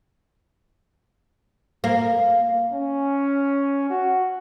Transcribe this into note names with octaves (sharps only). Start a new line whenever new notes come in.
A#3
C#4
F#4